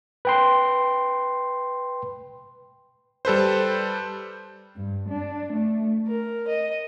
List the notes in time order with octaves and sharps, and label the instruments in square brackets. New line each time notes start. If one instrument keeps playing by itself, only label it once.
[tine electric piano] B4 G5 C6
[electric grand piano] G3 A4 B4 C5
[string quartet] G2
D4
A3
A#4
D#5